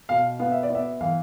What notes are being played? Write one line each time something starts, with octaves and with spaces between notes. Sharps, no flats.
B2 F5
B3 F5
E5
D5
B3 E5
E3 F5